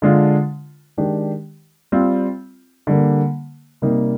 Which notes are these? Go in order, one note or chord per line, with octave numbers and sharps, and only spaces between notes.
D3 G#3 D4 F4
D#3 G#3 D4 G4
G3 C4 F4
D3 G3 A#3
C3 G3 A#3 D#4